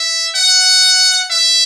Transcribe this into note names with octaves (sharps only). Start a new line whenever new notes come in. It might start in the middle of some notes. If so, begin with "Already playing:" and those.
Already playing: E5
F#5
E5